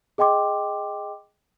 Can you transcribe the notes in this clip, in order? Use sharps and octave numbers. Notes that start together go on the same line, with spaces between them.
G#4 D#5 G5 C6 D6